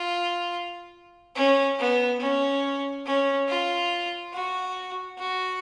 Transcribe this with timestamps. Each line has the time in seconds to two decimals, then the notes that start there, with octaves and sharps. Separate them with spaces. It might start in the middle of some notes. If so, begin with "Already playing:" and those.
Already playing: F4
1.36 C#4
1.79 B3
2.21 C#4
3.06 C#4
3.48 F4
4.33 F#4
5.19 F#4